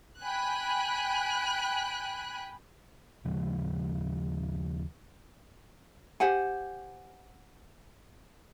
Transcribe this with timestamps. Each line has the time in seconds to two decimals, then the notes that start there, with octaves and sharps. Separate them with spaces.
0.22 G5 G#5 B5 F#6
3.25 D#2 C#3 F3 G#3
6.20 G4 C5 F#5 G#5